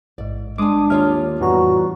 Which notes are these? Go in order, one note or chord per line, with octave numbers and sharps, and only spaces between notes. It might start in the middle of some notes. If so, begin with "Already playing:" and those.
A1 G#2 D5
G#3 D4 G#5 D6 D#6
D#2 F4 C#5 E5 F6
F2 A2 E3 G3 B3 F#4 A#5